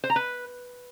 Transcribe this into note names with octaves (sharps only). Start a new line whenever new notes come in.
C5
A#5
B4